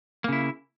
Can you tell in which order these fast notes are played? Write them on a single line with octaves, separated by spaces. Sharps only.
A#3 C#3 E4